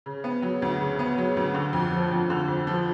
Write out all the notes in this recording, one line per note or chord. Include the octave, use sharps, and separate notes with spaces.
C#3
B3
F#3
D2
C#3
B3
F#3
D2
D3
F2
F3
F2
D3
F2
F3